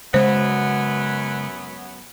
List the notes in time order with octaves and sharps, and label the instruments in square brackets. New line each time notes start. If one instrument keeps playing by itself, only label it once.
[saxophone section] F#2 F#3 B3 [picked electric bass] C#3 G#3 [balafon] C5